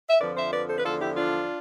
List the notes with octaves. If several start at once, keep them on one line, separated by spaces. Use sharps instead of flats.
E5
F2 D3 F3 B4 D5
C5 E5
B4 D5
A4 C5
B4
E2 D3 F3 F4 A4
E4 G4
D4 F4